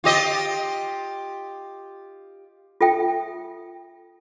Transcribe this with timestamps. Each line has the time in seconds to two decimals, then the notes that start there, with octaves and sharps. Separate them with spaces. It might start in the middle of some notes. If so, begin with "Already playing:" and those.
0.04 F4 G4 D#5
2.81 F4 A4 E5 G5